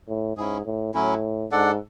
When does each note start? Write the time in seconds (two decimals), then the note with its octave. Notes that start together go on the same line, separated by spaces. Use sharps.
0.08 A2
0.37 G#2 C#4 E4 G#4
0.66 A2
0.94 A2 F#3 C#4 E4
1.52 G#2 D4 A4 D5 F#5